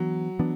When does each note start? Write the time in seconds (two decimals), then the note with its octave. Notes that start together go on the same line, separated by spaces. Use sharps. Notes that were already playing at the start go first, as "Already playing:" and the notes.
Already playing: E3 F#3 B3 D4
0.39 E3 B3 D4